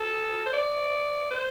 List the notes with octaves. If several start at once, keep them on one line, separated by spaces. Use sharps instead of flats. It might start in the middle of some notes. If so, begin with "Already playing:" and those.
Already playing: A4
C5
D5
C5